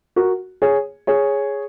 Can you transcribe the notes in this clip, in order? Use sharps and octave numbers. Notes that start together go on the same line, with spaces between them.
F#4 A#4
G#4 C#5
G#4 C#5